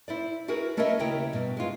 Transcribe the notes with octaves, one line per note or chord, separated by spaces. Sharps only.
E4 C5 D5
E4 F#4 G#4 A#4 B4
A3 C#4 A#4 B4 D#5 E5
D#2 C#3 E4 A#4 G5
G2 B2
G#3 F4